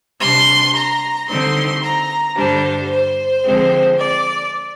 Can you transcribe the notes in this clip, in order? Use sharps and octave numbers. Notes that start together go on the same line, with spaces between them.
C3 G3 D4 C6
A#5
D3 G3 C4 D#4 C6
A#5
G2 D3 G3 D4 C5
C5
D3 F3 G#3 C4
D5